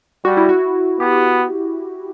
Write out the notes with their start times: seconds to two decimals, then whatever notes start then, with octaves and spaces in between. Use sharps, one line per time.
0.25 G3 F#4
0.37 E4
0.49 F#4
1.00 B3 G4